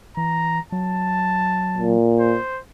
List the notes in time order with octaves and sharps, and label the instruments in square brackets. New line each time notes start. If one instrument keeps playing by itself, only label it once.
[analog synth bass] E3 [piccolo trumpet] A#5
[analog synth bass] F#3 [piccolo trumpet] A5
[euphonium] A#2
[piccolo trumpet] C5